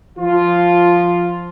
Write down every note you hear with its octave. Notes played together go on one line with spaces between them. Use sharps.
F3 F4